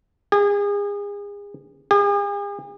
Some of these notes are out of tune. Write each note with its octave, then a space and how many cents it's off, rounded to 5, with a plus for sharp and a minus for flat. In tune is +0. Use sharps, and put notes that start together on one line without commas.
G#4 -35
G#4 -45